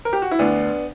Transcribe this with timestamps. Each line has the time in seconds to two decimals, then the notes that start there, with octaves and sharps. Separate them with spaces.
0.05 A#4
0.13 G4
0.22 F#4
0.31 E4
0.39 D2 B3 D4